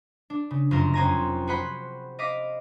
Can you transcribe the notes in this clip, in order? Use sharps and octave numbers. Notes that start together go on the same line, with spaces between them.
D4
C#3
F1 F#2 F4 A4 A#4
F2 C#4 C5 G#5 A#5 A#6
F#4 G#4 C5 F#5 B5
D#5 F5 D6 A#6 B6